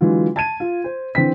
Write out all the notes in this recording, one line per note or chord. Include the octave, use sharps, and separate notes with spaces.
D3 E3 F#3 G#3 F4
A5 G#6 D#7
F4
C5
D3 E3 C4 C5 G5 B6